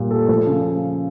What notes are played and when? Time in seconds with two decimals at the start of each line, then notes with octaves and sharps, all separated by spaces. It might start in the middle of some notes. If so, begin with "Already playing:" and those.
Already playing: A#2 G3
0.11 A4
0.29 F3
0.46 C#3